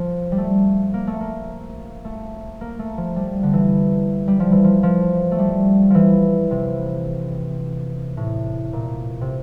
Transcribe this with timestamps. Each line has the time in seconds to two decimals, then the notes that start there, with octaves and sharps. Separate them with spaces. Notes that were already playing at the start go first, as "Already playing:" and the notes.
Already playing: F3
0.32 G3
0.38 A3
0.94 A#3
1.07 A3
1.20 A#3
2.05 A3
2.61 A#3
2.79 A3
2.98 F3
3.16 G3
3.43 D3
3.53 E3
4.28 G3
4.40 F3
4.52 E3
4.64 F3
4.83 F3
5.32 A3
5.39 G3
5.90 E3 F3
6.51 C3
8.17 A2
8.73 A#2
9.21 C3